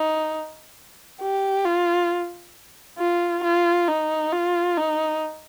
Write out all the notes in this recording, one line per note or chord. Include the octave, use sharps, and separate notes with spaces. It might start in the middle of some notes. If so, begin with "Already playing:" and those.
Already playing: D#4
G4
F4
F4
F4
D#4
F4
D#4